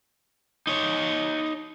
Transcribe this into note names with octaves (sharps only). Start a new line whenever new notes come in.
D#4 C#5